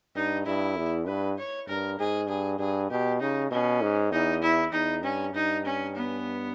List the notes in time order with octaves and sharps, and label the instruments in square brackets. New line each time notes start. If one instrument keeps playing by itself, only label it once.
[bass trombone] G2 [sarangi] D#4
[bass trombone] G2 [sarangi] E4
[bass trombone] E2
[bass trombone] G2 [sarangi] B4
[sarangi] C#5
[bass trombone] G2 [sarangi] A#4
[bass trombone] G#2 [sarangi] G#4
[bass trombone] G2 [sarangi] G#4
[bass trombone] G2 [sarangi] G#4
[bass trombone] B2 [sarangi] G4
[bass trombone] C#3 [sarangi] D#4
[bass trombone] B2 [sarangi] C#4
[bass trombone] G#2
[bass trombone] E2 [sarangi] D#4
[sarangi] E4
[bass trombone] E2 [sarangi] D#4
[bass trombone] G2 [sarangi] C#4
[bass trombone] G2 [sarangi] D#4
[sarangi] C#4
B3